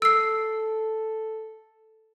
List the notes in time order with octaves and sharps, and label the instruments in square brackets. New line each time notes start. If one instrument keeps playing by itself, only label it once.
[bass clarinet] A4 [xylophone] E6 C7